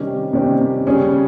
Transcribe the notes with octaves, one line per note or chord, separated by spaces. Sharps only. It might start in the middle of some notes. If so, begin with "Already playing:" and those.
Already playing: C3 D#3 G3 C#4 G4
C3 D#3 G3 C#4 G4
C#3 G3 C#4 G#4